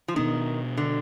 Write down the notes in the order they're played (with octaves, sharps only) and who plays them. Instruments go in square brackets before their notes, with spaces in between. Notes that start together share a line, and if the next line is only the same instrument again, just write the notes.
[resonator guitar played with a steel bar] F3
[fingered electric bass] B2 B3 D4 [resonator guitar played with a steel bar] D#3
[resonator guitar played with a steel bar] D3